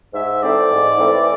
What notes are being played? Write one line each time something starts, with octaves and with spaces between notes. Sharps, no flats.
G#2 E5
E3 A3 C4 D5
G#2
E3 A3 C4